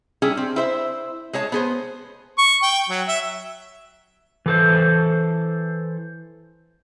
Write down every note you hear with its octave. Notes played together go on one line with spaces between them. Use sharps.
G3 C#4 D4 E4 G#4
C4
E4 C5 E5
G#3 G#4 C#5 A5
B3 G#4 C5
C#6
G5
F#3
E5
E3 A4 C5